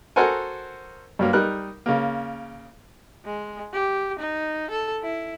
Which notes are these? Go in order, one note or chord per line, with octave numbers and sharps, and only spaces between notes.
F#4 A4 A#4 C5 F#5 G#5
G2 F#3 A#3
G3 D#4 A#4 F#6
C#3 A#3
G#3
G4
D#4
A4
E4